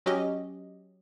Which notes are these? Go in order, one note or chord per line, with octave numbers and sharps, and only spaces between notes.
F#3 C#4 F#4 G4 D#5